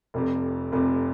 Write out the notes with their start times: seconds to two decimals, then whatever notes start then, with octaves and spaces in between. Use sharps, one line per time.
0.14 F1 F2 C3
0.72 F1 F2 C3